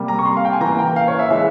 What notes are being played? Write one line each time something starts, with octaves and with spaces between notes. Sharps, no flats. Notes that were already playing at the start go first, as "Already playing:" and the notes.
Already playing: C3 G3 A#3
A#5
C#6
C6
F5
G5
G#5
E3 A#3 A#5
G5
F5
C#5
E5
E3 G#3 E5